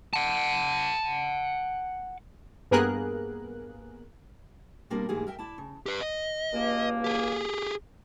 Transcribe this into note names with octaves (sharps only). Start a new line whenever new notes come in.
F#5 A5
G2 A#3 B3 G#4 A#4 F#6
B2 G3 A#3 C4 D4 A#4
D2 G#2 E3 A#3 G4 G#4
A#4 E5 G5
E4 D5 A5
C#3
G4 B4
D#5
C#2 G2 A#3
G4 G#4